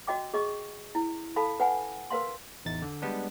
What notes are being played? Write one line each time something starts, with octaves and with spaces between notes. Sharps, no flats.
F#4 D#5 G5 D6
G#4 D#5 C#6
E4
A4 F5 A5 B5
B4 F#5 G#5
A#4 B4 F5 C6
A1 E2 D#4 A6
D3
G3 G#3 B3 D4